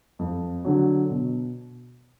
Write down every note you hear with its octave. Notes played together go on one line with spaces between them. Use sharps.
F2
D3 F#3
B2